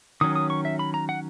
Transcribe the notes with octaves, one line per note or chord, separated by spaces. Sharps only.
D#3 F#3 C#4 D#6
D#6
C#6
E5
B5
A#5
F#5